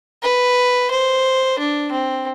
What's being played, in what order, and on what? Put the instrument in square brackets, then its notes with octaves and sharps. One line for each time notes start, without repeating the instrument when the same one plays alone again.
[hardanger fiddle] B4
C5
D4
C4